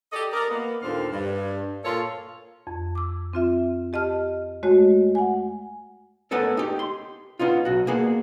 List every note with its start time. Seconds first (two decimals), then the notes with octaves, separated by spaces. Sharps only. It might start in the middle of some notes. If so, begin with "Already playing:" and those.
0.13 G4 A4 D5 D#5
0.33 A#4 D5 D#5
0.50 A#3 B3
0.82 D#2 A#2 D3 C4 A4 F5
1.12 G2
1.85 A#2 A#3 F4 A4 C#5
2.67 F2
2.95 D6 E6
3.33 C4 F4 E5
3.93 G4 D#5 A5 F6
4.63 G#3 A3 F#4 C#5 D#5
5.15 F#5 G#5
6.31 A3 B3 C#4 A4 A#4
6.57 D#4 G4
6.79 C6
7.39 B3 C#4 D#4 F4
7.65 B1 F#4
7.87 A#3 B3 G#4